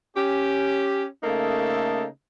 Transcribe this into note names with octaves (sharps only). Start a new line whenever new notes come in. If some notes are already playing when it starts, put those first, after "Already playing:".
C#4 G4
C#3 A3 A#3 D#4 A4